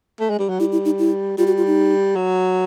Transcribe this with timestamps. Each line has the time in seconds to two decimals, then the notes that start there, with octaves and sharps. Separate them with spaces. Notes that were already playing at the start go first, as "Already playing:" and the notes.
0.20 A3
0.30 G#3
0.39 G3
0.49 F#3
0.60 G3 E4
0.72 E4
0.85 D#4
0.99 E4
1.38 G3 F4
1.47 F#4
1.57 F4
1.67 D#4
2.16 F#3